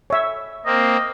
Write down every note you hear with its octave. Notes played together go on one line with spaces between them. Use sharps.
C#5 E5
A#3 C4 D#5